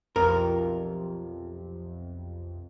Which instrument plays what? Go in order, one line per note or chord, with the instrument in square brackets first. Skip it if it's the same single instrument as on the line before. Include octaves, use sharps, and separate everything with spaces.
[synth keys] B1 F2 C3 [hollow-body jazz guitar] A#4